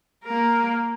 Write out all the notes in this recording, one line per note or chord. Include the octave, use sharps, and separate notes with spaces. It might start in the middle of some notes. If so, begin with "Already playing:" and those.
A#3 A#4